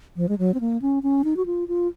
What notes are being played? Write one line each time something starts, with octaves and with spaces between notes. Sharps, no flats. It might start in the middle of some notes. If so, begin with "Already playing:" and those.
F3
G#3
F#3
C4
A#3
C#4
C#4
D#4
F#4
F4
F4